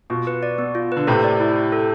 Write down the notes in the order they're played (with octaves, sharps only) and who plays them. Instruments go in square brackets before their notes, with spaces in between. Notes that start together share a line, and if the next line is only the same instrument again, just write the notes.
[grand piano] B2 [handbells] F4
[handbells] B4
D5
B3
F4
[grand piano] D3 [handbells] B4
[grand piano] A2 C3 [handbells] A4
[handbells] D5
E4
E4
A4